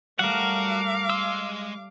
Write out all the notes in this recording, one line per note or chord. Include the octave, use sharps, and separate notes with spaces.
G3 A3 F#4 A#4 F5 F#5 D6
G#3 C6 E6